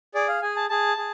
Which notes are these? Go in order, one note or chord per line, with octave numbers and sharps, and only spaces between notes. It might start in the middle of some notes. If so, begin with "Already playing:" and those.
G#4 D5
F5
G#4 G#5
A5
G#4 A5
G#4